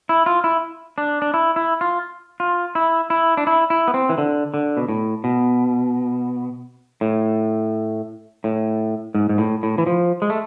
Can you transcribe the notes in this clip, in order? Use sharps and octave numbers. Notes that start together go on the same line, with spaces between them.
E4
F4
E4
D4
D4
E4
E4
F4
F4
E4
E4
D4
E4
E4
B3
C4
E3
D3
D3
B2
A2
B2
A2
A2
G#2
G#2
A2
A2
E3
F3
G#3
A3